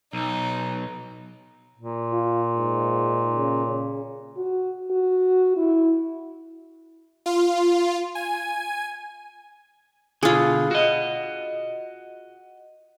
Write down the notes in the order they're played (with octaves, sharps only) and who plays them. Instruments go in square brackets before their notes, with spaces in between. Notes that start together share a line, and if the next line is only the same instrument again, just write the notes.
[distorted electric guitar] B1 [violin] D#4
[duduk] A#2
[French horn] F4
G#2
C#3
C#3
[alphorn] F#4
F#4
E4
[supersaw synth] F4
G#5
[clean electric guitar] B2 D3 [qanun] F4 G#4
[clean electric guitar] F#4 D#5